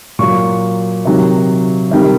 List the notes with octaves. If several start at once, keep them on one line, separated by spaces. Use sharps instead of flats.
A#2 F#3 C#6
C3 D#3 F#3
C3 D#3 G3